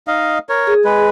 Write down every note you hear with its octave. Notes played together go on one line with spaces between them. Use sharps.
D#4 D#5 F5
A#4 C#5
G#4
G#3 B4